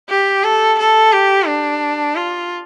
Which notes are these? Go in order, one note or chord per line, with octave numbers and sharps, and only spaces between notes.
G4
A4
A4
G4
D4
F4